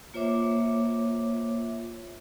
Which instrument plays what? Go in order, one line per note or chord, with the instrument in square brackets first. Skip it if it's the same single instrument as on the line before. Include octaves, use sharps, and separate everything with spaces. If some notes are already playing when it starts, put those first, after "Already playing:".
[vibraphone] A#3 F4 C5 C#5 E5 D6